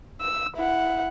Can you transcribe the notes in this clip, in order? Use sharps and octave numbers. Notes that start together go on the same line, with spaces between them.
E6
E4 F#5